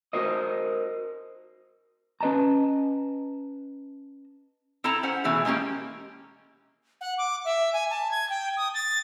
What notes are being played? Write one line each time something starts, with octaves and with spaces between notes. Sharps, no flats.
F#4 A#4 C5 D#5
C#4 B4 D#5 A5 A#5
C4 E4 A4 A5 A#5
C#4 C5 F#5
B2 E3 A3 E4 G#4
G#3 A#3 C#4 G4
F#5
D6
E5
G#5
A5
G#6
G5
D#6
A6